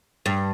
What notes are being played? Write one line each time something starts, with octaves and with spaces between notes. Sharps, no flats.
G2